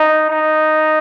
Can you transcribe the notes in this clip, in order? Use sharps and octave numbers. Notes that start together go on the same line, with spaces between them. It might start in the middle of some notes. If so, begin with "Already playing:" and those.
Already playing: D#4
D#4